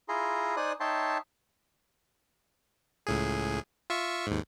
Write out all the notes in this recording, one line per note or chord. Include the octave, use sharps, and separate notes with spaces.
E4 F4 G#4 A#5 C6
D#4 C5 D5 G#5 D#6 F#6
D#4 C#5 E5 G5 A5 C6
C#2 A2 G#4
F4 E5 C#6
D#2 G#2